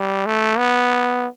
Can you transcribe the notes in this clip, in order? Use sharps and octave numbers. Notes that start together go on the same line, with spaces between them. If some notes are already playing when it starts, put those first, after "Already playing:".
Already playing: G3
A3
B3